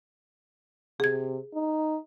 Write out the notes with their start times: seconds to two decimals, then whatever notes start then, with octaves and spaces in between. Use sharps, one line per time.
1.00 C3 G#4 G#6
1.54 D#4